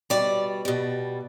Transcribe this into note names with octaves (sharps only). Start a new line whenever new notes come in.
B2 G3 D5
B2 G3